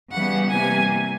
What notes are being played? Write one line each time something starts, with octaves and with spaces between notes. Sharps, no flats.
C#3 E3 G3 B3 F#5
C3 E3 G3 A#3 G#5